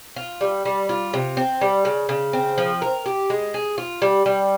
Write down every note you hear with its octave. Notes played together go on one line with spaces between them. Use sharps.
F4
G3
G3
F4
C3
C4
G3
C#3
C#3
C4
F3
A#4
G4
G#3
G#4
F4
G3
G3